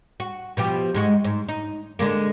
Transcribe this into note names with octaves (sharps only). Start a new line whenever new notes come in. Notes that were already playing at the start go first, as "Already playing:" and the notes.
F#4
B2 F3 G4
G#2 G#3 F#4
G#2
D#4
D3 G#3 A#3